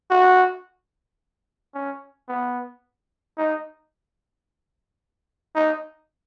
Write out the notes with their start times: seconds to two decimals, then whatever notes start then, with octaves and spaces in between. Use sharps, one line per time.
0.11 F#4
1.74 C#4
2.28 B3
3.38 D#4
5.55 D#4